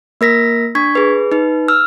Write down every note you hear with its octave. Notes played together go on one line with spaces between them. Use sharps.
A#3 A#4 A#6 B6
D4 C#6 G#6 B6
G#4 B4
D#4 B4
E6 F6